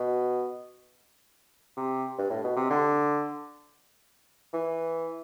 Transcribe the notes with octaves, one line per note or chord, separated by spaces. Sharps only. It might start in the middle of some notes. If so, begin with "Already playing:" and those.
Already playing: B2
C3
G2
A2
B2
C3
D3
E3